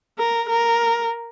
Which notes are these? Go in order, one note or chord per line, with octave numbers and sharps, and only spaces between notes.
A#4
A#4